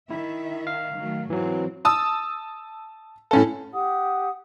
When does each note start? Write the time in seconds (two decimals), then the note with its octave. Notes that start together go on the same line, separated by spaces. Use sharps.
0.11 D#3 E4 E5
0.67 F5
0.97 D#3 F#3 A3
1.30 G#2 E3 F#3 C4
1.85 A5 D#6 E6
3.31 A2 C#4 A4
3.73 G4 F#5 D#6